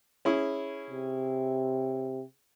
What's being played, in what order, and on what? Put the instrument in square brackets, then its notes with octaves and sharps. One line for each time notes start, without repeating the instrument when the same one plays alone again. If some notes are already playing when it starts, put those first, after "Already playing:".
[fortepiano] C#4 E4 G#4
[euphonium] C3